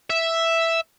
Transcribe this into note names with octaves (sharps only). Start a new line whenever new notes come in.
E5